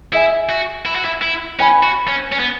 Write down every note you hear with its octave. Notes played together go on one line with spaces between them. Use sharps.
E4 G#4 E5 G#5
F#4
E4
F#4
E4
E4
C#4 B4 G#5 B5
F#4
C#4
C#4
B3